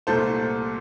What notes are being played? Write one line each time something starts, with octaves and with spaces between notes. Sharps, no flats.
C2 A#2 A3 A4 C5